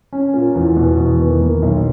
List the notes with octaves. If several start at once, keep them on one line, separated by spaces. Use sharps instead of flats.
C#4
A#2
E2
B2
E2
D#3
A#3
B1